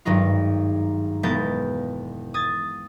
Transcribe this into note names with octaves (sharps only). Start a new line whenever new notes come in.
G#1 G2 F#3 D#4 F4
E1 G#3 A#3 B3 G6 A6
D#6 G#6 A6